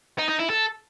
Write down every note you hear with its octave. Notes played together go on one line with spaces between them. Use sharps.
D#4
D#4
E4
A4